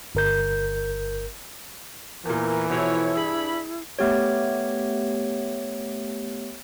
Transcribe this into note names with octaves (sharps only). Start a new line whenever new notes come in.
G1 A#4 G6
E2 A#2 E3 A#4
B2 F3 E4 A4 C#5
G2 D4 G#4 B5
A3 B3 G4 C#5